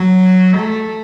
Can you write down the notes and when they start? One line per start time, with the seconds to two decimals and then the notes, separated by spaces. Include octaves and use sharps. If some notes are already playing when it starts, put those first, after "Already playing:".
Already playing: F#3
0.58 A3